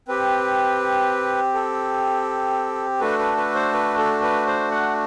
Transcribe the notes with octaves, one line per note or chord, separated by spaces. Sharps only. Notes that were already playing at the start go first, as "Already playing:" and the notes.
C4 G4 B4
A4
A3 D4 F#4 A4 B4
B4
B4
C5
B4
A4
B4
C5
F#5